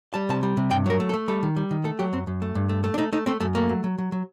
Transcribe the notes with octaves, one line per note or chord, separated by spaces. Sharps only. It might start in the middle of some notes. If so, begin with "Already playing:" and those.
G3 A5
C3 A5
G3
C3
G2 G5
F#3 A#4
A3
A4
A3
G3 A4
D#3
G3
D#3
A3 A4
F#3 G4
F#2 C4
F#2
A3
G2
A3
A3
D4
A3 D#4
A3 D#4
A3 C4
F#2 A3
A3 A#3
F#3
F#3
F#3
F#3